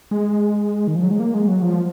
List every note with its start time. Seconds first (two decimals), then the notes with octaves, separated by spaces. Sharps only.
0.11 G#3
0.88 D#3
0.96 F3
1.03 F#3
1.11 G#3
1.20 A#3
1.34 G#3
1.48 F#3
1.62 F3